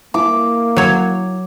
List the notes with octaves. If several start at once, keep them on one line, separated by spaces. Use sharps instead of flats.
A#3 E4 D6
F#3 C#5